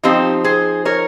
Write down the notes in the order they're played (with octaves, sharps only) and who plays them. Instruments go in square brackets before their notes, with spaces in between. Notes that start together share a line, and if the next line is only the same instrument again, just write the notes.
[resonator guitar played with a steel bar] F3 C4 D#4 G4
G#4 C5
A#4 C#5